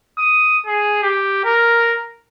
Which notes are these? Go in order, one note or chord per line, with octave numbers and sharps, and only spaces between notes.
D#6
G#4
G4
A#4